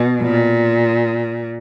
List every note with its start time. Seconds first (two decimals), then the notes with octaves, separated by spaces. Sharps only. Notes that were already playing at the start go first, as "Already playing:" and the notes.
Already playing: B2
0.22 A#2